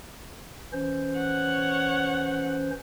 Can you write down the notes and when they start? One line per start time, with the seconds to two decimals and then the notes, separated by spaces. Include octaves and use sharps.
0.73 E3 C#4 C5
1.18 C#5 F#5